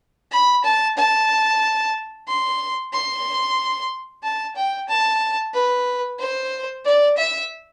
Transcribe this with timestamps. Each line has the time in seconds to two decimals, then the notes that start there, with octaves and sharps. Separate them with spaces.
0.32 B5
0.64 A5
0.97 A5
2.28 C6
2.93 C6
4.23 A5
4.56 G5
4.89 A5
5.54 B4
6.19 C5
6.85 D5
7.17 E5